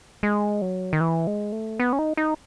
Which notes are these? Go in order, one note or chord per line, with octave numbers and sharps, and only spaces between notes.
G#3
F#3
D#3
E3
G#3
A3
B3
C#4
D#4
D#4